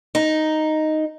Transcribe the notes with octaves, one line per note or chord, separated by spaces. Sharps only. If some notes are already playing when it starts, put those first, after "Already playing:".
D#4